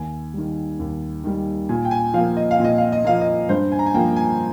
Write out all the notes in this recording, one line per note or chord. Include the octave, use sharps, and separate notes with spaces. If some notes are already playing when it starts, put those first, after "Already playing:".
Already playing: D#2 G#5
D#3 G3
D#2
D#3 G3
A#2 G#5
G5
G#5
F3 A#3 F5
D#5
F5
A#2 D#5
F5
D#5
F3 A#3 F5
D#5
G2 C5
G#5
A#5
G#5
F3 A#3 G5
G#5